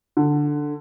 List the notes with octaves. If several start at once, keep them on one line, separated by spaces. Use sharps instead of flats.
D3